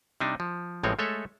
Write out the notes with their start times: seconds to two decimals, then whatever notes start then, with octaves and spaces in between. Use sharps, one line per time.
0.20 C3 G3 D4 D#4
0.40 F3
0.83 A1 A2 F3 G#3 C4 C#5
0.99 G#3 A3 A4 C#5 E5